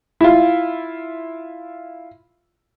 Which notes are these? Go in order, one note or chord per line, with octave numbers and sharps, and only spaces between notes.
E4 F4